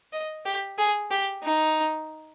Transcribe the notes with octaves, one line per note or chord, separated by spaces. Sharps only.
D#5
G4
G#4
G4
D#4